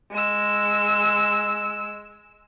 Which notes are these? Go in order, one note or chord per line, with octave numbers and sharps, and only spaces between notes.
G#3 E6